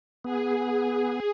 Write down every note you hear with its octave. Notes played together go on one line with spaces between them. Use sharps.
B3 G#4